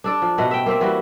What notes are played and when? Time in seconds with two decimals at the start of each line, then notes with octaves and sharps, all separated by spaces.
0.04 D4 A4 D5
0.22 F3
0.38 B2 A3 D#5 F#5
0.51 E5 G5
0.66 A#3 C4 E5
0.81 E3 G3 F#4